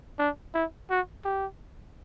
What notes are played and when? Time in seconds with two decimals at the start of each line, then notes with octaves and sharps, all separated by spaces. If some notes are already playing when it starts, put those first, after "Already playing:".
0.19 D4
0.54 E4
0.90 F#4
1.25 G4